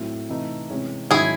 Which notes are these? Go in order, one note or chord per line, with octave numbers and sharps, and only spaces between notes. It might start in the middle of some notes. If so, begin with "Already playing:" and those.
Already playing: A2 F#3 C4 E4
C3 E3 A3 D#4
C3 E3 G#3 C#4
G#2 D#3 F#3 C#4 E4 G#4